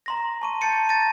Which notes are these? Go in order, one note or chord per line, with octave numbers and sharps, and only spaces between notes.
A#5 C6 A#6
A5 C#6 D#7
A5 G6 A6 C#7 D#7
A#5 A6 A#6 D#7